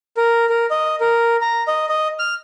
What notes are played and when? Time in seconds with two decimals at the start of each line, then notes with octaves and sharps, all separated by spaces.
0.17 A#4
0.50 A#4
0.70 D#5
1.00 A#4
1.41 A#5
1.68 D#5
1.89 D#5
2.19 F6